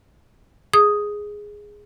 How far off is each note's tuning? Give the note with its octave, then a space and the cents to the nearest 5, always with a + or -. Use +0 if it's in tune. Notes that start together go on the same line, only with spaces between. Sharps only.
G#4 +0 D#6 +0